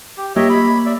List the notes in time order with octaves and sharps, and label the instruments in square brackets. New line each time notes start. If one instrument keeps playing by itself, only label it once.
[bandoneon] G4
[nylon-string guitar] A#3 G4 [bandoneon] C#5 D#5 E5
[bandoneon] B5
D5 E5